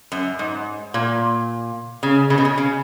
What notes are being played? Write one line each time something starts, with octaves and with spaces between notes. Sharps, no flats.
F#2
G#2
A#2
C#3
C#3
B2
C#3
C#3